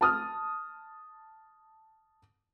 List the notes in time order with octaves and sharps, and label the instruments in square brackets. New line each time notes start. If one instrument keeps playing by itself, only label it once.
[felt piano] A5 D#6 F6